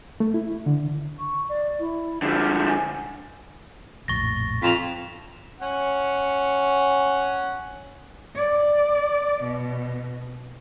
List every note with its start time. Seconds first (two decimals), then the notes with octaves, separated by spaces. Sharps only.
0.20 A3
0.34 E4
0.66 D3
1.19 C#6
1.48 D5
1.79 E4
2.22 D3 F3 G#4
2.67 G#5
4.08 A#1 F2 A2 C#6 A6 A#6
4.62 F2 B6 E7 F7
5.60 C#4 F#5
8.35 D5
9.42 B2